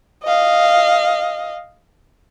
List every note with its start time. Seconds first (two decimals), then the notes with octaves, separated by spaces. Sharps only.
0.24 D#5 F5